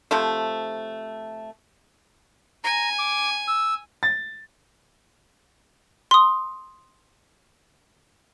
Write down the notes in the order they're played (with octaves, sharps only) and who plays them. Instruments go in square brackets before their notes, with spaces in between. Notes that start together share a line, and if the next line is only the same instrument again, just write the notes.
[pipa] C3 F3 A3
[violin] G#5 [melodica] A#5
[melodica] D6
E6
[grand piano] A6
[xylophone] C6 D#6